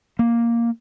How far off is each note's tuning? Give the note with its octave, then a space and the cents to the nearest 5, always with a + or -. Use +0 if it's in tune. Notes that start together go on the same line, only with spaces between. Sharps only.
A#3 +0